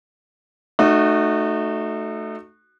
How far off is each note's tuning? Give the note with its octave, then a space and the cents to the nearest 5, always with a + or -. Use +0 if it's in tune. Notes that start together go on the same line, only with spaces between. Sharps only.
A3 -5 D#4 -35 F#4 +0